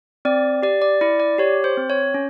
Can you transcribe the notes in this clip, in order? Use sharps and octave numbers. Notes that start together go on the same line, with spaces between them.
C4 D5
G4 D5
D5
E4 D5
D5
G4 C#5
C5
C4
C#5
C#4